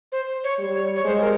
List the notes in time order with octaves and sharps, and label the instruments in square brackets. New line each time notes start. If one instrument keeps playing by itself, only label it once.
[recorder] C5
C#5
[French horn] G3
[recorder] C#5
C#5
[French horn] G#3 [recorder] C5
[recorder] A#4